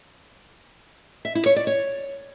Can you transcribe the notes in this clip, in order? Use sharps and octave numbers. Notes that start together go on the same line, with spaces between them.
E5
E4
C#5
D5
C#5